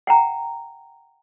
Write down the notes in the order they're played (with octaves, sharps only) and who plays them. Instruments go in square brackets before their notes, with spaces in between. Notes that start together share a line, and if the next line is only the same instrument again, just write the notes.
[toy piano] F#5 G5 A#5